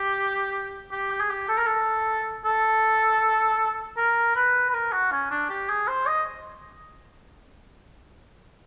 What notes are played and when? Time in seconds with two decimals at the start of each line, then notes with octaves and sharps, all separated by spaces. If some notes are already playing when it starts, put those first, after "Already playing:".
Already playing: G4
0.92 G4
1.11 G4
1.20 G#4
1.30 G4
1.49 A4
1.58 A#4
1.67 A4
2.45 A4
3.97 A#4
4.36 B4
4.69 B4
4.74 A#4
4.93 F#4
5.12 C#4
5.31 D4
5.50 G4
5.69 G#4
5.88 C5
6.07 D#5